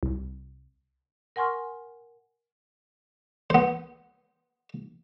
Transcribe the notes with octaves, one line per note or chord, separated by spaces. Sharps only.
C2
A#4 F#5 G#5 C6 C#6 F6
B3 C5